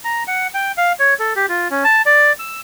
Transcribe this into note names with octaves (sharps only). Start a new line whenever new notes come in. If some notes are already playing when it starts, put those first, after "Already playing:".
A#5
F#5
G5
F5
C#5
A4
G4
F4
C#4
A5
D5
E6